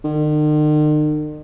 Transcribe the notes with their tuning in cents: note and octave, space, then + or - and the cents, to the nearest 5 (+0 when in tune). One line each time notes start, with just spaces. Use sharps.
D#3 -45